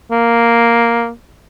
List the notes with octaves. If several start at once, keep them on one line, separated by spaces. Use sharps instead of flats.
A#3